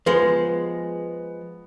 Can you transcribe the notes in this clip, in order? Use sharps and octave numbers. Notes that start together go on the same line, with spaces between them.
F3 G#3 B3